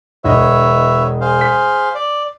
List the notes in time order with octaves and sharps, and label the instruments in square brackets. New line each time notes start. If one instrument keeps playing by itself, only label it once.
[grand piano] E1 D3 D#5 [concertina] B4 C#5 E5
[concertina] G#4 C5 F5
[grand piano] B6
[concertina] D5